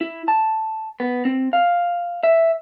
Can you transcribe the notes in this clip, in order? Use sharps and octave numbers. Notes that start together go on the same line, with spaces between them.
E4
A5
B3
C4
F5
E5